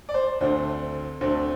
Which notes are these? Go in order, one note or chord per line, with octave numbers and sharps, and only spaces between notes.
D5
C5
D2 D3 A3 C4 C5
D2 D3 A3 C4